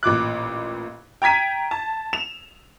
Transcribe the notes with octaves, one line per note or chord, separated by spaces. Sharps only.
A1 A#2 D6 F#6
G5 A#5 G#6 B6 D#7
A5
E7 F7